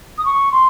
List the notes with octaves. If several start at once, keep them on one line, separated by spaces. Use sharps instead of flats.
D#6
C#6
C6